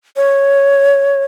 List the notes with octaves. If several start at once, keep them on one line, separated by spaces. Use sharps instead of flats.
C#5